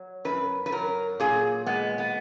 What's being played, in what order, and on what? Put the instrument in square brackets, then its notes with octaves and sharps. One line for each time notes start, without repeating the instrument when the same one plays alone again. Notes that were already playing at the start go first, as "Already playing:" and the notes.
Already playing: [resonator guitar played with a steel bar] F#3
F#2 B4
B4
F#3 A#4
A#2 G#4
G#3 B3
B3